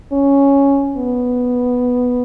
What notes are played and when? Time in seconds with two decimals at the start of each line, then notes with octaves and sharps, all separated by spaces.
0.12 C#4
0.97 B3